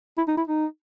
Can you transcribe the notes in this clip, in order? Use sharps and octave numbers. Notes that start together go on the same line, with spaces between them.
E4
D#4
E4
D#4